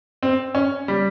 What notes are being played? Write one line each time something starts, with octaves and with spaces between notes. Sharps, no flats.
C4
C#4
G3